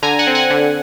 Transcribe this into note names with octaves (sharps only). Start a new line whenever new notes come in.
D3 G#5 A#5
F#5 G#5
C4
F#5 G#5
D3